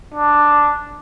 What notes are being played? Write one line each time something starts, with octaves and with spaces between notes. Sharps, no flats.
D4